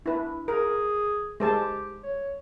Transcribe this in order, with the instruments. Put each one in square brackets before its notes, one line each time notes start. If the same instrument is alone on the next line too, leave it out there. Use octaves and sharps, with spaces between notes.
[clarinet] D4 [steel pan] E4 B4
[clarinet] G#4 [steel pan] A#4
[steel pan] G#3 C5 A5 [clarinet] G4
[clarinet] C#5